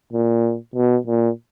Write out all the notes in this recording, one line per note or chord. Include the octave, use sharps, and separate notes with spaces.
A#2
B2
A#2